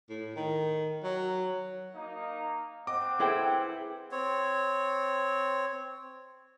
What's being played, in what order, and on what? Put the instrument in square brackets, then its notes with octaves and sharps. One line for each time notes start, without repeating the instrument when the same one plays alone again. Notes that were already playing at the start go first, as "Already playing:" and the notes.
[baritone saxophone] A2
D#3
F#3
[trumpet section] A#3 D#4
[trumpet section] C4 F#5 [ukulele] D#5 [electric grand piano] D6
[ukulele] E4 A4 G5 [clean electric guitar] G#4 B4 C5
[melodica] C4 C#5